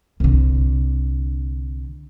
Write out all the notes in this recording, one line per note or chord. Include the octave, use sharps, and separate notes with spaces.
C2 D3